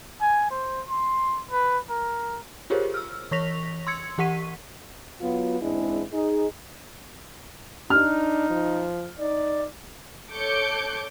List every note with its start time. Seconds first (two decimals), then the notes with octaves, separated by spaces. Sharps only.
0.21 G#5
0.51 C5
0.89 C6
1.51 B4
1.90 A#4
2.70 F4 G4 G#4 A#4 C5 C#5
2.94 E6 F6
3.31 E3 C#5 C#6 A#6 B6 F7
3.87 C6 E6 G#6 C#7
4.18 E3 G4 F#5 C#6 B6 D#7
5.21 F#3 B3 F4
5.61 E2 G#2 G#3 C4 D4 E4
6.12 D#4 G#4
7.90 D4 D#4 F6
8.50 F3
9.19 D#4 D5
10.32 A4 C#5 D6 G6 C#7